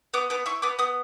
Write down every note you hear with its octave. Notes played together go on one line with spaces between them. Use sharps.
B3 D6
B3 D6
E4 C#6
B3 D6
B3 D#6